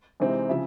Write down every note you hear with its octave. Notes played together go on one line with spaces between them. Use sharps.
C3 E3 G#3 C4 D#4
C#3 F3 E5